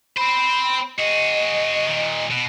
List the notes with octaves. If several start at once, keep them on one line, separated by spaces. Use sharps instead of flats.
C4 C5 B5
F#4 G#4 D#5
A#2 D#3
B2